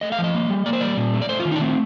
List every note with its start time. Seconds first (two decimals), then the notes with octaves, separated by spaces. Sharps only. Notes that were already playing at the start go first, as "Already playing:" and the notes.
0.01 A3 D#5
0.12 F5
0.19 F3
0.24 D#5
0.34 A#3
0.50 G3
0.66 A#3 D5
0.73 C5
0.81 G3 D5
0.97 A#2
1.14 A3
1.22 D5
1.29 A3 C5
1.40 F4
1.45 D#3
1.51 D4 D#4
1.61 A3 C4